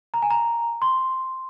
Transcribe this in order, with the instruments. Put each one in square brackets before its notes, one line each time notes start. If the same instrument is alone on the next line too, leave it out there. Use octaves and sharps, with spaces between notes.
[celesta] A#5
G#5
A#5
C6